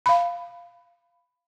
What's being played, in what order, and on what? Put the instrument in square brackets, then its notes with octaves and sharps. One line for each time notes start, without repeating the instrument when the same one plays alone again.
[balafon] F5 B5